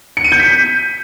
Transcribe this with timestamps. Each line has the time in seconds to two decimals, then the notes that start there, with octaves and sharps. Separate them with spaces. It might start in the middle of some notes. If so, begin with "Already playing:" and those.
0.17 C#7
0.24 D#7
0.32 G6
0.39 B6